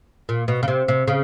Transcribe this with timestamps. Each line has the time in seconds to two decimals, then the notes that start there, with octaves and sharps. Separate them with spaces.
0.29 A#2
0.48 B2
0.63 C#3
0.68 C3
0.88 C3
1.08 C#3